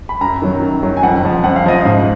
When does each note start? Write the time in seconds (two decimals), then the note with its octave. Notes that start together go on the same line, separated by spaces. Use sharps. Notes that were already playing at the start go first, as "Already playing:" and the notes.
0.09 B5
0.21 F#2 A#5
0.42 D#3 F#3
0.62 F#2
0.83 D#3 F#3
0.97 G#5
1.03 F2 F#5
1.23 C#3 F3
1.44 F2 F#5
1.56 F5
1.64 C#3 F3 D#5
1.81 G#2 F5